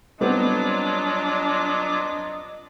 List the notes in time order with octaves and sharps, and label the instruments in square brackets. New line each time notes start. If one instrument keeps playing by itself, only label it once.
[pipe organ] F#3 F4 D6 [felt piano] G3 B3 C4 [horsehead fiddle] D4 [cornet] D#5